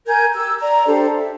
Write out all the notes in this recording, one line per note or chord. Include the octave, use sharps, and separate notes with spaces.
A#4 G#5 G6 G#6
G4 E6
D5 A#5
D4 G4 A4 C5
E5